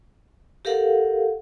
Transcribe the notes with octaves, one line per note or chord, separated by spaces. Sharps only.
G4 A4 A#4 F5 F#5